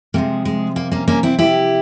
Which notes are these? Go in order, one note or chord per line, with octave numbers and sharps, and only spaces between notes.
C3 F3 G#3 A#3
G#3
A#3
A#3 C#4
A#3 C#4
C4 E4
E4 G4